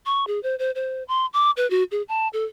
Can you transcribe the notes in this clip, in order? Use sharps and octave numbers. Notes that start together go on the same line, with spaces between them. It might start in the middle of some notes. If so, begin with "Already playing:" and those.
C#6
G#4
C5
C5
C5
C6
D6
B4
F#4
G#4
A5
A4